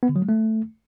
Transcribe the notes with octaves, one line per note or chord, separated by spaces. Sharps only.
B3
D3
F#3
G#3
A3